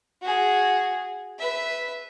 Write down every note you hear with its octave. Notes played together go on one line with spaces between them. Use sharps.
F#4 G#4
B4 E5